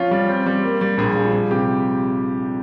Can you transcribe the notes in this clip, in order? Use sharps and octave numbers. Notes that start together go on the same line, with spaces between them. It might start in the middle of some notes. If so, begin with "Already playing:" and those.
Already playing: F3 C#4 F4
G3
C4
G3
A#3
G3
A#1 G#4
F3
G3 G#4
C3 G4